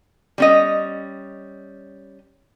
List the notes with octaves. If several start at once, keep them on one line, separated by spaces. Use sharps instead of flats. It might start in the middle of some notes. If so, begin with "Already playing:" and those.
G3 C#4 D#5